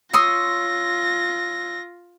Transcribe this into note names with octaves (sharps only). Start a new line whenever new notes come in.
F4 C#5 C6 D#6 E6 A#6